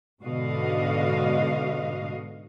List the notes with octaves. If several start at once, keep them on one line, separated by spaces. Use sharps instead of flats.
G#2 B2 D3 F#4 D#5 F5